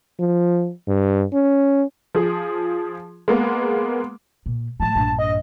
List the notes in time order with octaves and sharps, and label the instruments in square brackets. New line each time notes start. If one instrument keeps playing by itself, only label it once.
[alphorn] F3
G2
C#4
[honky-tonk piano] F3 G#4
G#3 A#3 B3
[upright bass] A#2
[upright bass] A2 F3 [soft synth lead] A5
[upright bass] A#1 G2
[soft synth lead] D#5